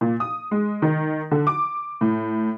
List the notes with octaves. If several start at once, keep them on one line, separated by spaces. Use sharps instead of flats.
A#2
D#6
G#3
D#3
D3
D6
A2